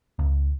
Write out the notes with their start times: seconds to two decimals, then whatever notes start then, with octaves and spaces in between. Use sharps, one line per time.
0.19 C#2